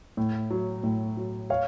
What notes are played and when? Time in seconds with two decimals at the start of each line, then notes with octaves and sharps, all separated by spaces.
0.17 A2
0.51 F#3
0.83 A2
1.17 F#3
1.50 C#5 F5